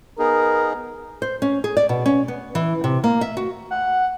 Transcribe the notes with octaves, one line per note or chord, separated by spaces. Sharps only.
B3 D#4 G#4 A#4
C5
C#4
G#4
D5
B2
C#4
B3
E3
C3
A#3
E5
F#4
F#5